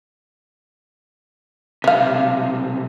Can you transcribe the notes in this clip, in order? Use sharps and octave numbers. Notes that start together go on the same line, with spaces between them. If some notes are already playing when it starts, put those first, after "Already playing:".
B1 C3 E5 F5